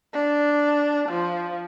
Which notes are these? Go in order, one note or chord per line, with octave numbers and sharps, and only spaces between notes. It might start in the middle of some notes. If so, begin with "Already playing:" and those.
D4
F3